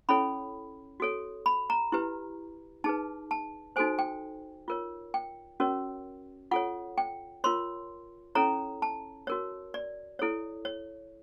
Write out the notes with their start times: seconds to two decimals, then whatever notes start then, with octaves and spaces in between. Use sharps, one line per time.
0.09 C#4 E4 A4 C#5 B5
1.00 F#4 A4 C#5
1.46 B5
1.70 A#5
1.92 E4 G4 B4
2.84 D#4 G#4 B4 A5
3.31 A5
3.76 D#4 F#4 A4 C5 G#5
3.99 G5
4.68 F4 A#4 C#5
5.14 G5
5.60 C#4 F#4 A#4 C#5
6.51 F4 A4 C#5 F#5
6.98 G5
7.44 F4 A#4 C#5 C6
8.35 C#4 E4 A4 C#5 A#5
8.82 A5
9.27 F#4 A#4 C#5
9.74 D5
10.19 E4 A4 C#5
10.65 C#5